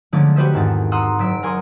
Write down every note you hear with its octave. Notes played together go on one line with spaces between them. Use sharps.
D3 F3 G#3 A3 C#4 D5
F#4 G4 B4 C5 D#5 E5
E2 G#2 D#3 C4 A4
F#5 A#5 C6 D#6 E6
F#1 F#3 E6 B6 D7
A#4 F#5 G#5 C6 C#6 D#6